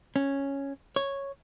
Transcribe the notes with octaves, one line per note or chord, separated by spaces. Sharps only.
C#4
C#5